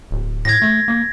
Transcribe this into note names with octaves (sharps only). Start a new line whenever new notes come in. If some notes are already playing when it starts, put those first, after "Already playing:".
D1
A2 G#6 A#6
A3
A#3